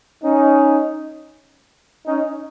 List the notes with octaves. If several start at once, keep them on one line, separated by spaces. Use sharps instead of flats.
C#4 D#4
C#4 D#4